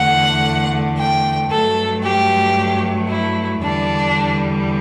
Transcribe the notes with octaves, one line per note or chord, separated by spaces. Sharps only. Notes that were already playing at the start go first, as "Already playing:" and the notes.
Already playing: E2 D3 A3 F#5
G5
G2 F#3 A3 A4
G4
E4
E2 D3 G3 D4